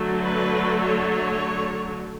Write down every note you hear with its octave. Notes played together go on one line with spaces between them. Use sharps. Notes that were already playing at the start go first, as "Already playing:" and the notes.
Already playing: D3 F#3 A3
B4
C#5